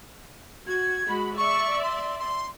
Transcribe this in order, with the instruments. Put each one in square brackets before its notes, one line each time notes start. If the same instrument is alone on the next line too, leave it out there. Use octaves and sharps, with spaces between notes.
[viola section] F#4 [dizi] G#6
[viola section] G#3 F#4 B5
[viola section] D5 E5 [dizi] C#6
[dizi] C6
C6